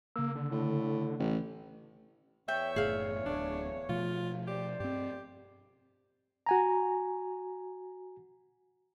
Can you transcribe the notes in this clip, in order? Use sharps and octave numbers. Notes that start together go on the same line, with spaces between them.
C#3 A#3 E6
D3
A2
A1
E2 C#5 E5 G5
F#1 A2 G#4 F5
D1 D4
B2 F3 A3 F4
G4 C5 D5
G2 C4 G4
F#4 G#5 A#5